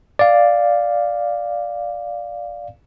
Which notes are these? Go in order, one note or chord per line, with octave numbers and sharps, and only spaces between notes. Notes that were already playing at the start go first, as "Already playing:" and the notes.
D5 F5